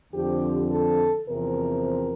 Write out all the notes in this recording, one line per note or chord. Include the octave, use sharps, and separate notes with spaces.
F2 D3 F3 C4 G4
A4
E2 C3 F3 C4 A#4